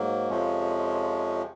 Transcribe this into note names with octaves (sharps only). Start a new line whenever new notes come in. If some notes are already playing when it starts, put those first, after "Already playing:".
Already playing: G#2 F#3 A#3
F2 C3 F3 G#3 C#4